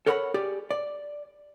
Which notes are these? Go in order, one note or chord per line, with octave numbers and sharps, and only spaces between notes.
A4 A#4 C#5 F#5 A#5 B5
G4 G#4 D5
D5